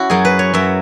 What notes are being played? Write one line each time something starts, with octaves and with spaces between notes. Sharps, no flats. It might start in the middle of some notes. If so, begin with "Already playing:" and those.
Already playing: C#4 E4 F#4
F#2 F#3 G#4
B4
C#5
F#2 F#3 E5